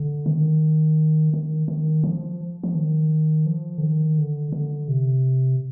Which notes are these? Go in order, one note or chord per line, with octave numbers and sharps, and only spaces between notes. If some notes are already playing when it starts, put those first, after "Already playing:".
Already playing: D3
D#3
D#3
D#3
F3
F3
D#3
F3
D3
D#3
D3
D3
C3